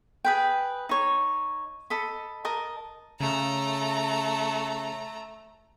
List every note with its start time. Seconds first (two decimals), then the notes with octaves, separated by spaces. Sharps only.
0.25 G#4 B4 G5
0.89 D#4 C#5
1.90 A4 D#5 B5
2.45 A#4 D#5 A5
3.20 C#3 A3 A#5